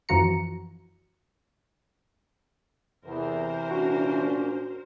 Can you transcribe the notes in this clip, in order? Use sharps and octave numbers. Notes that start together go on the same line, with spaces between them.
F#2 E3 F3 F#4 A#5 C#7
E2 C3 E3 A#4 C5
A#2 C#4 D4 F#4